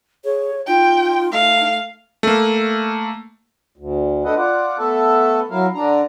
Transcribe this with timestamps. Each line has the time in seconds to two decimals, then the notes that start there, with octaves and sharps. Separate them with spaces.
0.24 G#4 C#5
0.68 D#4 F4 G5
1.32 A3 F5
2.23 A3 A#3
3.77 D2
4.25 A3 D4 A4 B4 D#5 F#5
4.37 F4 D5 F#5
4.79 A3 B3 A4 E5 A5
5.51 F#3 E4 A#4 F5
5.75 D3 D4 A#5